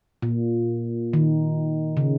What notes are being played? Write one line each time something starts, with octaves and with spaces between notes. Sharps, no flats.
A#2
D#3
C#3